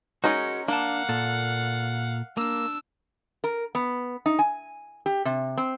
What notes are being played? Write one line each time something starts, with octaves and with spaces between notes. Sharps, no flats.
G#3 C#4 D#4 F#4 G#4 A#4 C#7
A#3 D4 F5 F#5 A5
A#2 A4
A#3 D4 E6
A#4
B3
D#4
G#5
G4
C3
C4